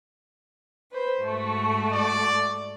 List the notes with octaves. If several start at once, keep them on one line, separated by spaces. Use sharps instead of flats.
B4 C5
G#2 A3 F#4
D5